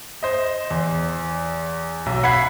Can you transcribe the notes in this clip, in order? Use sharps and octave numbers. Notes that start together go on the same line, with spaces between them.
C5 D#5
E2
B1
F#5 B5 G#6 B6 C7